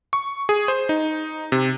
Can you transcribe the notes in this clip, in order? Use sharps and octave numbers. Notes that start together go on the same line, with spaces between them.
C#6
G#4
C5
D#4
C3